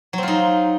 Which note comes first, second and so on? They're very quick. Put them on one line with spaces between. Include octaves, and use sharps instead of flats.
F#3 C4 F4 D#4